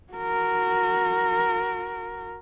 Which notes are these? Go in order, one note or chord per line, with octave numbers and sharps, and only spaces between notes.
F#4 A#4